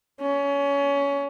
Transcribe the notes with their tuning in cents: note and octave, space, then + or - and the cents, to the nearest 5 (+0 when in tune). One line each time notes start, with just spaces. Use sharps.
C#4 +25